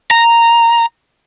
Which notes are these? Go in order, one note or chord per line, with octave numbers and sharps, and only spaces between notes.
A#5